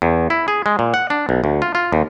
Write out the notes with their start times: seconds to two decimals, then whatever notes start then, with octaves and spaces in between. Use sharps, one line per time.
0.02 E2
0.30 E4
0.48 G#4
0.66 G#3
0.79 A#2
0.94 F#5
1.10 D4
1.29 B1
1.44 D2
1.62 F4
1.75 F4
1.92 D#2